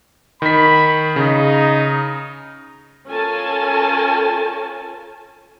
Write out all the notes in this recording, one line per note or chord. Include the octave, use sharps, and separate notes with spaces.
D#3 B5 B6
C#3 D#4
C#4 F4 A4 A#4 G#5 A5